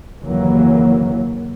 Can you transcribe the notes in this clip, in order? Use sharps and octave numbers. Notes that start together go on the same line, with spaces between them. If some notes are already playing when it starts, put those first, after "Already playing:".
F#1 D#2 E3 F#3 A#3